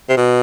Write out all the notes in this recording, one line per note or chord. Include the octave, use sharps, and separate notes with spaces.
C3
B2